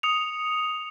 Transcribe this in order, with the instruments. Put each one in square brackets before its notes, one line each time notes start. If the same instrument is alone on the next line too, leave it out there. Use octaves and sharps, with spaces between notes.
[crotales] D#6 C#7 F7